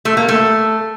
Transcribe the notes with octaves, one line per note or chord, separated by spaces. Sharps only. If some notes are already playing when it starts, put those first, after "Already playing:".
A3
A#3
A3